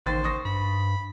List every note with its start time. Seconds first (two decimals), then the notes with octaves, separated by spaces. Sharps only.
0.06 A1 D#2 C5 G5 A6
0.24 C#6 D#6 A#6
0.45 G2 B5